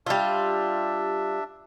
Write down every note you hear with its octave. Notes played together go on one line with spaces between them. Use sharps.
G3 D4 F4 E5